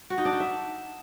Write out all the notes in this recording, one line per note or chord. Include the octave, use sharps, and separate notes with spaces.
F#4
D#4
D4
D#4
E5